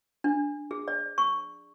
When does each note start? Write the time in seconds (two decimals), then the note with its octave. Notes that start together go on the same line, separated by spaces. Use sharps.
0.24 D4
0.71 G#4
0.88 D5
1.18 C#6